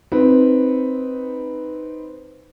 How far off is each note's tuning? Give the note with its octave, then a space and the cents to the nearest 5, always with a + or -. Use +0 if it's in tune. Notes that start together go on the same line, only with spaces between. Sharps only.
C4 +0 D#4 +0 B4 +0